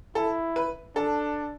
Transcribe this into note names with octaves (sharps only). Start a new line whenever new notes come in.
E4 A4
B4
D4 A4